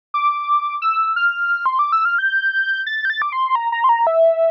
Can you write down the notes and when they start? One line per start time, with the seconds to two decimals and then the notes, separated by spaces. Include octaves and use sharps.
0.14 D6
0.82 E6
1.16 F6
1.66 C6
1.79 D6
1.92 E6
2.05 F6
2.18 G6
2.86 A6
3.05 G6
3.10 A6
3.22 D6
3.32 C6
3.55 A#5
3.72 A#5
3.84 C6
3.89 A#5
4.07 E5